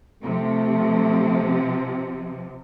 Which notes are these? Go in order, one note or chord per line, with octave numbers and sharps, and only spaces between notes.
C3 F3 A3